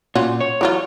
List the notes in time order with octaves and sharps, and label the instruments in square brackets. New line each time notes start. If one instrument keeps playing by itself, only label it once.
[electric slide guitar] A#2 [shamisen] C#4 F4 F#4
[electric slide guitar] C#5
[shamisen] E3 F#3 F4